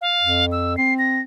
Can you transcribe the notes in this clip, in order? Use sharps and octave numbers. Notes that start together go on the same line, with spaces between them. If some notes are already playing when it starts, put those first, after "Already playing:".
F5
F2
E6
C4 C7
A#6